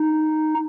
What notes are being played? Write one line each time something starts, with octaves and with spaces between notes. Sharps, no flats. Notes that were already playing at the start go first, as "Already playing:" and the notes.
Already playing: D#4